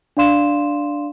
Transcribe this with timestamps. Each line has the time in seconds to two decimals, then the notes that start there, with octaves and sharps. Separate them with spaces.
0.17 D4 D5 F5 C6 E7